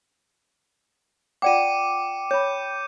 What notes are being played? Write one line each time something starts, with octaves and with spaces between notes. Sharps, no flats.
F4 D5 F#5 G5 D6 C#7 D#7
C#5 B5 G6